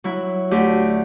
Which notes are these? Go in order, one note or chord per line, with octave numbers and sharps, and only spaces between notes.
F#3 E4
D2 G4